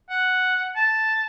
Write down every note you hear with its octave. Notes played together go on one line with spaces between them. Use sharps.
F#5
A5